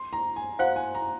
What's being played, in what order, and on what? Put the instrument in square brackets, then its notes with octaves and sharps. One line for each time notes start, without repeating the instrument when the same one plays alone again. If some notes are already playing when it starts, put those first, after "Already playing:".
Already playing: [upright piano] C6
A#5
G#5
[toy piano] F#4 C5 F5 [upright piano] F#5
[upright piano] G#5
A#5